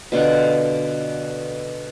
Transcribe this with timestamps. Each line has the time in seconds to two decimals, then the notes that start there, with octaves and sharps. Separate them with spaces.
0.12 B2 D3 F4 F#5